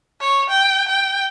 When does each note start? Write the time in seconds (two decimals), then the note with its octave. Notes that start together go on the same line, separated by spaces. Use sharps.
0.21 C#5
0.49 G5
0.88 G5